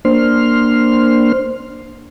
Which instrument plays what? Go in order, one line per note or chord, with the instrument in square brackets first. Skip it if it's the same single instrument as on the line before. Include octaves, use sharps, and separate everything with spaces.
[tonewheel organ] A#3 D4 C5 C6 F6